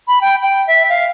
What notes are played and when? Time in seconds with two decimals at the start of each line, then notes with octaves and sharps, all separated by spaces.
0.08 B5
0.21 G5
0.43 G5
0.67 E5
0.89 F5